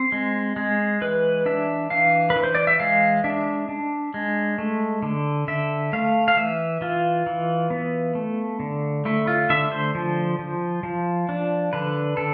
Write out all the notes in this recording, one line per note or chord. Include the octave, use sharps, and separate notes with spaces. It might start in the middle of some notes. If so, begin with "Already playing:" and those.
Already playing: C4 C5
G#3
G#3
E3 B4
D4 E5
E3 F5
B4
E3
C5
D5
E5
G#3 F5
D4 E5
D4
G#3
A3
D3
D3 E5
A3 F5
F5
E3 E5
E3 F4
E3
B3
A3
D3
A3 E4
F4
D3 E5
C5
F3
F3
F3
D4
D3 B4
D3 A4